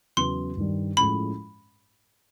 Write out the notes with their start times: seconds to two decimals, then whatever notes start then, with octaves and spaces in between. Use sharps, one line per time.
0.17 E2 C#3 F#3 B3 C6
0.57 G2 D#3 G3
0.97 A2 F3 G#3 C#4 B5